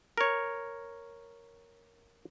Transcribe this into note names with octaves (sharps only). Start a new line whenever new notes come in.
A#4 C#5